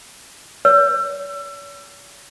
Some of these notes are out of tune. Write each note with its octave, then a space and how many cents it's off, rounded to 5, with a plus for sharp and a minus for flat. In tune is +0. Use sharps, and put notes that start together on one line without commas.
C#5 +45 E6 +35